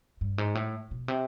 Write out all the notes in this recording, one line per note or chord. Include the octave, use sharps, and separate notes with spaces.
G2
G#2
A2
B2
C3